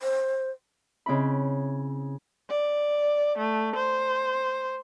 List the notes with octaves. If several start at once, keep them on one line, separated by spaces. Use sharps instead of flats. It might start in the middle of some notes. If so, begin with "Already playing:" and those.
C5
C#3 C4 E4 B5
D5
A3
C5